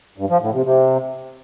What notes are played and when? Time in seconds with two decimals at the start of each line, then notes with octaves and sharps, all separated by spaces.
0.18 G2
0.29 F3
0.41 A2
0.53 C3
0.64 C3